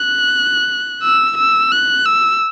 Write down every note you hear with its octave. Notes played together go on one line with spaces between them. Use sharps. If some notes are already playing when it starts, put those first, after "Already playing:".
Already playing: F#6
E6
E6
F#6
E6